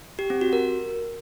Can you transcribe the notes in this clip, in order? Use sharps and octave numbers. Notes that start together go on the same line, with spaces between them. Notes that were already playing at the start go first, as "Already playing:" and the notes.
G4
C4
F#4
A#4